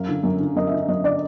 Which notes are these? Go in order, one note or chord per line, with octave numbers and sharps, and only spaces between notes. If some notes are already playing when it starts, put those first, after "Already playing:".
Already playing: F#2 F5
D3
F#2
D3
F#2 D#5
E5
D3
F#2 D#5
D3 D5